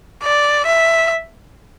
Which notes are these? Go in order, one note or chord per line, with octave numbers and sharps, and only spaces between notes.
D5
E5